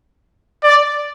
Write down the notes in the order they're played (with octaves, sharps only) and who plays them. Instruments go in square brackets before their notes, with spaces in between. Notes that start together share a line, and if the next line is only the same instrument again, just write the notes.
[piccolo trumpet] D5